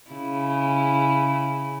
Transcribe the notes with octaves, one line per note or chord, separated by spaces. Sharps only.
C#3 E4